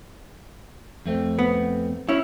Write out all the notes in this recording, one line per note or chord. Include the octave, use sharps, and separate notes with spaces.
F2 A3 C4
B3
C#4 E4 C#5